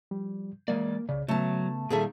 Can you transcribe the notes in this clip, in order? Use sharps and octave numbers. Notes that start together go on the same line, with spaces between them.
F3 G3
E3 G#3 A#3 D5
C2 C#3 D5
C#3 F#3 A3 B3 A5
A#2 D#3 G3 G#4 A4 E5